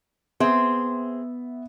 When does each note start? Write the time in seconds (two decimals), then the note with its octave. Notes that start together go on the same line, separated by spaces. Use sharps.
0.40 B3 C4 G#4 C5 E5